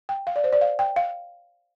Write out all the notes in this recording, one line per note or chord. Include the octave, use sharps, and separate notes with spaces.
G5
F5
D5
C5
D5
F5
G5
F5